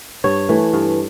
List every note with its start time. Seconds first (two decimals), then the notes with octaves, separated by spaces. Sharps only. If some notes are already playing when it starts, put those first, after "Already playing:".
0.24 G2 C#5
0.49 E3 A3
0.73 G2